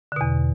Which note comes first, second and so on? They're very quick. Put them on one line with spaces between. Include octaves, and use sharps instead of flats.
D3 B2 E2